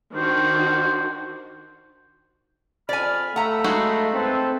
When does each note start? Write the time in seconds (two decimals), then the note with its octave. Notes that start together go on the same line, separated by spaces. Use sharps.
0.15 D#3 D4 F#4 C5
2.89 F2 D5 G#5 B5 F6
3.36 A3 F5 F#5 A#5 B5 E6
3.64 G#3 D#4 F#4
4.14 C4 A4 B4